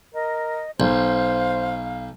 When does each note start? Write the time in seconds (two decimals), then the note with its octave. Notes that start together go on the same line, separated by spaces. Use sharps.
0.14 A#4 D#5
0.80 B1 C5 F5